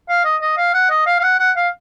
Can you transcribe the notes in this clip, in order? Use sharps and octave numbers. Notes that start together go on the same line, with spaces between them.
F5
D#5
D#5
F5
F#5
D#5
F5
F5
F#5
F#5
F5